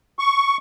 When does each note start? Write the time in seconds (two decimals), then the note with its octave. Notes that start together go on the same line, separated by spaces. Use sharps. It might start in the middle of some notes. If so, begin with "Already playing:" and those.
0.19 C#6